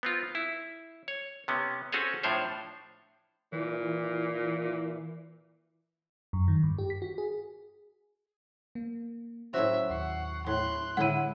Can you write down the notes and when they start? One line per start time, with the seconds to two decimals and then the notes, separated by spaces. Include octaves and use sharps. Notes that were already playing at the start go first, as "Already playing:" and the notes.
0.03 B3 C4 F4
0.35 E4
1.08 C#5
1.48 C3 B3 C#4
1.92 C4 C#4 F#4 G#4 A4 C#5
2.23 A2 F3 D4 C5 C#5
3.52 A#2 E3
6.33 F#2
6.48 D#3
6.63 G2
6.78 G4
6.90 B6
7.02 F#4
7.18 G#4
8.75 A#3
9.54 A2 F#3 C#4 F#4 C5 C#5 E5
9.90 D#2 F#5 C#6 C7
10.46 A2 C6 F#6
10.97 A2 D3 G#3 E4 F#5 D#7